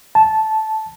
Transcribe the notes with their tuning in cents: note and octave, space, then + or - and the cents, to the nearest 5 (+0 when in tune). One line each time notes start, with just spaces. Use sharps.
A5 -10